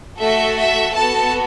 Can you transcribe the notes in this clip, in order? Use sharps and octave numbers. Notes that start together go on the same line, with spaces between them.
A3 F#4 A4 E5
E5
B3 F#4 A4 A5